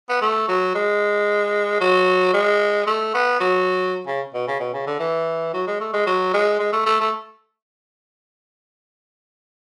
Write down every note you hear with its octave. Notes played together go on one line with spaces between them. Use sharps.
B3
A3
F#3
G#3
F#3
G#3
A3
B3
F#3
C#3
B2
C#3
B2
C#3
D3
E3
F#3
G#3
A3
G#3
F#3
G#3
G#3
A3
A3
A3